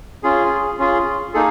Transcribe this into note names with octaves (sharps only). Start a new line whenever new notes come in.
C#4 F4 G#4
C#4 F4 G#4
A#3 D#4 G#4 A4